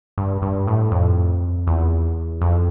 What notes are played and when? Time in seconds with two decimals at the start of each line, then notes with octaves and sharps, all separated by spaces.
0.18 G2
0.42 G2
0.67 A2
0.92 F2
1.67 E2
2.41 F2